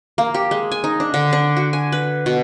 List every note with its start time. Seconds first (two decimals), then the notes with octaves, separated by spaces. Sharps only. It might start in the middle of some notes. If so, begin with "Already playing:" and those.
0.18 A#3
0.34 G4
0.51 G#3
0.72 G#5
0.84 D#4
1.00 D4
1.14 D3
1.33 D4
1.56 F#4
1.73 G#5
1.92 B4
2.26 B2